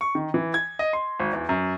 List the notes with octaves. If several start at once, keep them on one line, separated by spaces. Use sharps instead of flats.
C#6
D#3
E3
G#6
D#5
C6
G#1
E2
F#2